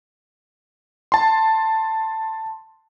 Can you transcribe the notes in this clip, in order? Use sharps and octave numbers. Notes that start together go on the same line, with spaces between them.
A5 C6